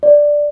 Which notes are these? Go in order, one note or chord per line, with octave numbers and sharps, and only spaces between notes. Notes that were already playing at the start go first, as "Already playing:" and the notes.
D5